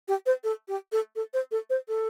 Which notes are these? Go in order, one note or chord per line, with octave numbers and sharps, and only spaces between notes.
G4
C5
A4
G4
A4
A4
C5
A4
C5
A4